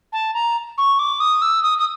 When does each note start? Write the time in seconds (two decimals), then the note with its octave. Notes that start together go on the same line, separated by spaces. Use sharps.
0.12 A5
0.34 A#5
0.78 C#6
0.99 D6
1.20 D#6
1.42 E6
1.63 D#6
1.78 D#6